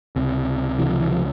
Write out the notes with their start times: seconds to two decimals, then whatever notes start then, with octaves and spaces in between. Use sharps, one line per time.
0.16 C#2 C3
0.78 C#2 C3 E3
0.89 F3
1.00 E3
1.11 F3